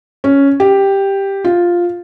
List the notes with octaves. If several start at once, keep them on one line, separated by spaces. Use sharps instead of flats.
C#4
G4
F4